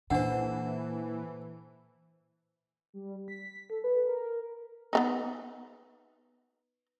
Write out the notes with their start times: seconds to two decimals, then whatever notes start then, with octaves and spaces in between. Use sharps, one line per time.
0.10 A#2 E3 D4 A4 C5 F#5
2.94 G3
3.28 B6
3.70 A4
3.84 B4
4.07 A#4
4.93 B3 D4 D#4